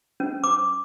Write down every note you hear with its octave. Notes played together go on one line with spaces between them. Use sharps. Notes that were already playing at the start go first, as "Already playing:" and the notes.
C#4
D6